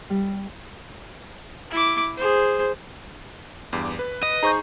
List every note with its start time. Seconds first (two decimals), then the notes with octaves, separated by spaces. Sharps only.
0.10 G3
1.71 E4 D6
2.17 G#4 C5
3.73 E2 G2 D6
3.99 B4
4.23 D#5
4.43 D#4 G#4 C5 A#5 C#6 G6